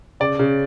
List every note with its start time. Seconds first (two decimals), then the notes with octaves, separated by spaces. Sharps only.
0.20 C#3 D5
0.39 C#3